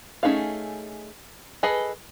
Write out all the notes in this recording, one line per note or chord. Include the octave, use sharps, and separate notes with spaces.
A3 C#4 D#4 G#4 F5
G#4 A4 B4 D#5 G#5